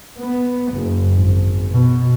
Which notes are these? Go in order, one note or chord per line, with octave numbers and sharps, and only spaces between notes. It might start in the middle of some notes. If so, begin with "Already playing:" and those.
B3
F#1
G#1
B2